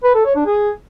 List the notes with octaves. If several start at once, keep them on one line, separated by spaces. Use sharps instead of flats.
B4
A4
C#5
D4
G#4